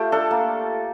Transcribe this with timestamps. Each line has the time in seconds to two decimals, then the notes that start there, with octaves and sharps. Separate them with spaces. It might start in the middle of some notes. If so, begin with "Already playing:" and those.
Already playing: A3 F4 G4
0.12 D4 A4
0.31 A#3